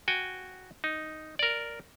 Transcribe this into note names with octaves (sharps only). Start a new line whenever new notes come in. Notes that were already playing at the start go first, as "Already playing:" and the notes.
F#4 G5 G#5
D#4
A#4 D5